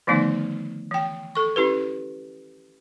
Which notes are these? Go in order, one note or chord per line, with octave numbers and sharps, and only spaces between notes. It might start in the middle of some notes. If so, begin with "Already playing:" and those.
D3 D#3 F3 A3 B3 D#4
E3 G5
A4 C#6
C#4 E4 G4 B4